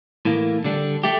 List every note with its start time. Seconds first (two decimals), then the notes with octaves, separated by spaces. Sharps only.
0.25 A2 E3 A#3
0.64 D3 G3 D4
1.04 A3 G4